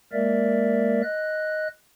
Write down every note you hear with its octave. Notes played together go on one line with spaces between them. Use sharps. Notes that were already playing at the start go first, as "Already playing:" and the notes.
G#3 A#3 A#4 D5 E5
D#5 F#6